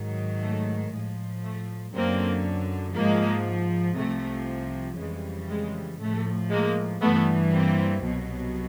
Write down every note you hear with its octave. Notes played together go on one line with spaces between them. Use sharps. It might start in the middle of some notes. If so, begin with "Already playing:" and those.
Already playing: G#2 D#3 F#3
A3
A2 F3 G#3
A3
F#2 D3 F#3 A#3 C4
G#2 F3 G#3 A#3
C2 C3 F3 A3
F2 C#3 E3 G3 G#3
G#3
A2 F3 A3
G#3 A#3
G2 E3 G3 A3 B3
A#3 C4
C2 B2 F#3